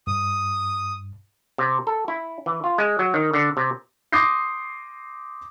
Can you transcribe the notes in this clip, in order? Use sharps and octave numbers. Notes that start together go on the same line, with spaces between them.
G2 D#6
C3
A4
E4
E3
F4
G#3
F#3
D#3
D3
C3
C6 D6 D#6 G6 A#6 C7